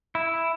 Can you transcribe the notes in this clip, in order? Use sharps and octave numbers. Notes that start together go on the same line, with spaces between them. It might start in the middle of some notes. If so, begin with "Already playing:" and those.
E4